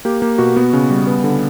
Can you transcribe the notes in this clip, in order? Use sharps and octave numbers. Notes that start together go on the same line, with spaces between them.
A#3 G4
A#3 G4
B2 F#4
B3
C#3
G3
B3
D3